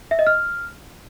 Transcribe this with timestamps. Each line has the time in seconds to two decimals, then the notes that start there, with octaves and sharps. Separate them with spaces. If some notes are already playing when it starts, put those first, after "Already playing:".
0.11 E5
0.19 D#5
0.27 F6